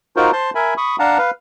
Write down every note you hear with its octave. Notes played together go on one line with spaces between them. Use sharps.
D#4 F4 F#4 A#4 C5
C5 A5 C6
A#4 E5 G#5 B5
B5 C#6 D#6
D4 F5 F#5 A5 A#5
B4 F5